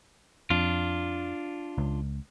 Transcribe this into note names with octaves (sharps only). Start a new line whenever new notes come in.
F2 D4 F4
C#2